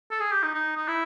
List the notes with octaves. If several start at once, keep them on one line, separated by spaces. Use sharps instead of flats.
A4
G#4
G4
D#4
D#4
D#4
E4